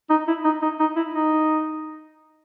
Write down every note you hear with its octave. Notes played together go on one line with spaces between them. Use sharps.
D#4
E4
D#4
D#4
D#4
E4
D#4